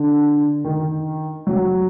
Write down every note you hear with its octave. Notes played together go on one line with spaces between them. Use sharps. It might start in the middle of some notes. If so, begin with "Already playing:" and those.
Already playing: D3
D#3
F#3